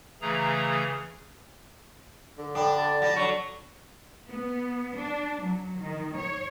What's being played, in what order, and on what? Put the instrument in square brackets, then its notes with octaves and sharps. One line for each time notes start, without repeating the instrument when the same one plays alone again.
[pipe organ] C#3 E3 A3 G#4 A#5
[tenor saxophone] D3
[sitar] D4 [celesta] A4 G5 B5
[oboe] A5
[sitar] G3 [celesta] F#5 A#6
[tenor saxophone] D3 [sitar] F#3 [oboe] C#6
[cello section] B3
D4
F#3
D#3
C#5